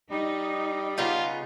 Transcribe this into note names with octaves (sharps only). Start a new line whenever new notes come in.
G3 D#4
C#3 B3 D#4 F4